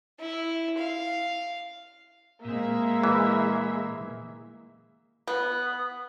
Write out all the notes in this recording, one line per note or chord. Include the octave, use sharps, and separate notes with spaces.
E4
F5
A#2 G#3 A#3 C4 E5
E3
B3